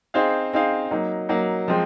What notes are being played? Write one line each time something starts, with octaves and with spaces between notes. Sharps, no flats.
C4 D#4 G#4 C5 F5
C4 D#4 G#4 C5 F5
F#3 A#3 D#4
F#3 A#3 D#4
F3 G#3 C4